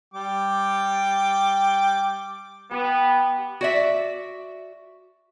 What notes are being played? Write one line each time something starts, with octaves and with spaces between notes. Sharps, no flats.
G3 G5 D6
B3 G4
F#4 D5 E5